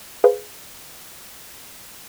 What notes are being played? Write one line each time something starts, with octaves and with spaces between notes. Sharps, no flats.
G#4 B4 C5 F5